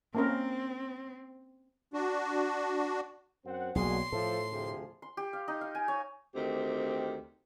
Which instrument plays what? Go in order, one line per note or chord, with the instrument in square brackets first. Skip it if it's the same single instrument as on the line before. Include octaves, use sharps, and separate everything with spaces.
[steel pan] A#3 C#4 A#4 [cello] C4
[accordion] D4 F#4
[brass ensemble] F#2 C4 F#5
[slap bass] B1 A#3 [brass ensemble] F#3 D5 [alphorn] G#4 [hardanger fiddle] C6
[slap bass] A2 [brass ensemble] F3 [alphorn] A4
[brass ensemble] D2 F3 G#4 [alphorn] C3
[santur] C6
G4
F5
D#4
F5
G#5
C#5
[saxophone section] D2 D#3 C4 G4